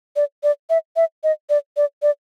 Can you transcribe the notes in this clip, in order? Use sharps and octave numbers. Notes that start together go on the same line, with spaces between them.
D5
D5
E5
E5
D#5
D5
D5
D5